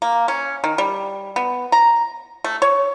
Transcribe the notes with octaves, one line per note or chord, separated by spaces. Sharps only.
A#3
C#4
D#3
G3
B3
A#5
A3
C#5